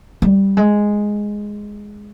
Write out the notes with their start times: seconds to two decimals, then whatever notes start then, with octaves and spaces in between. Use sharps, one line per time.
0.22 G3
0.57 G#3